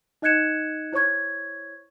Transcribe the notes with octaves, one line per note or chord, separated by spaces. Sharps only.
D#4 D#5 F#6 G#6 C#7 E7
E4 C5 C#5 C#6 G#6